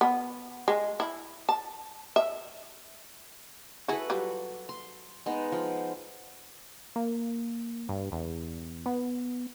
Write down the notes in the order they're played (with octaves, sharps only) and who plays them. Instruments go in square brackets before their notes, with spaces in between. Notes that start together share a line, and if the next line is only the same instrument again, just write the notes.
[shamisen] B3
G#3
E4
A5
E5
[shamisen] E4 G#4 [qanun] F#4 A4 B4
[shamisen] F#3 G3 F4
[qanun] C6
G#3 B3 D#4
F3
[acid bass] A#3
G2
E2
B3